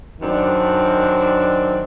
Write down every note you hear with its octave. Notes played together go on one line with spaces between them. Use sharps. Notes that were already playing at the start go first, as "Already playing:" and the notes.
F#2 D#3 C4 D4